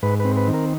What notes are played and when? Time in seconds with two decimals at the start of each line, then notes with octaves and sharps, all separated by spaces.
0.03 G#2 B4
0.20 B4
0.25 C4
0.36 B4
0.48 D#3
0.53 A#4